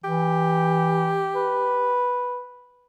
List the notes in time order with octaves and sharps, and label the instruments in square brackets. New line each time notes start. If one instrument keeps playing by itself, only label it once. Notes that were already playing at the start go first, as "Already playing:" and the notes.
[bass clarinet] E3 [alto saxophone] G4
[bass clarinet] B4